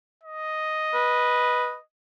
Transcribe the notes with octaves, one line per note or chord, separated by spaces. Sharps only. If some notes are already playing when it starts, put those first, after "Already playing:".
D#5
B4